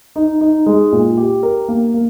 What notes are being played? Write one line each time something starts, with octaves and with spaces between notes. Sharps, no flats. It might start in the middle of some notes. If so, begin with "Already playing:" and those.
D#4
D#4
G#3
A#2
G4
A#4
A#3
A#3